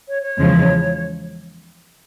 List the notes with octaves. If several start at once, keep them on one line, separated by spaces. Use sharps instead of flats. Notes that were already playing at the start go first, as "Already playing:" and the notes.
C#5
C#5
E2 C#3 F3 G#3